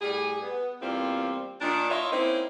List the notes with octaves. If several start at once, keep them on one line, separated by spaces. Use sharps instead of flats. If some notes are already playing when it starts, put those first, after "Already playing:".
A2 G3 G#4
B3
E2 G3 A#3 C4 F4
A#2 D#3 D4
E4 F4 C#5 D#5 E5
A#3 C4 C#4 D#4 E4